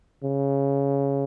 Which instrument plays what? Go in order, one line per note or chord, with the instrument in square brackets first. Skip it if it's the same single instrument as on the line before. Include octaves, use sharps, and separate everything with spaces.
[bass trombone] C#3